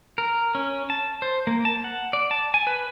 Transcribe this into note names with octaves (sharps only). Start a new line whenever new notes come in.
A#4
C#4
A5
C5
A#3
A5
F#5
D5
A5
G#5
B4